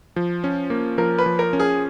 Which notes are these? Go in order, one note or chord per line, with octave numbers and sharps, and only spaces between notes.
F3
C#4
A#3
F3 A#4
B4
F3
A#4
C#4
G#4